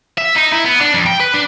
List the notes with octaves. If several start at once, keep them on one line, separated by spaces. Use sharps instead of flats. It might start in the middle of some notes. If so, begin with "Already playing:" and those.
E5
D#4
E4
B3
D4
F2
G5
B4
D4